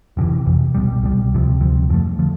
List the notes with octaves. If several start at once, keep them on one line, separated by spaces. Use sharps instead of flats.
F1 F2 C3 E3
F1 F2 C3 E3
C2 B2 G3
C2 B2 G3
D2 C3 F3
D2 C3 F3
F2 D3 F3 A3
D3 F3 A3